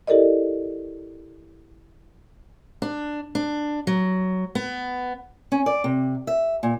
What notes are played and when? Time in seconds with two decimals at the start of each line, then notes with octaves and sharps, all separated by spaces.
0.07 E4 G4 A4 A#4 D5 D#5
2.82 D4
3.35 D4
3.87 F#3
4.55 B3
5.52 C#4
5.66 D5
5.84 C3
6.27 E5
6.63 A#2